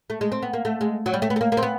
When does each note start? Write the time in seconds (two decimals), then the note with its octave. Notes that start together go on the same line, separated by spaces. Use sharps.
0.10 A3
0.21 G#3
0.32 C4
0.42 B3
0.53 A#3
0.65 A3
0.81 G#3
1.06 F#3
1.14 G3
1.22 A3
1.30 B3
1.36 A3
1.41 A#3
1.52 A#3
1.57 C4
1.63 B3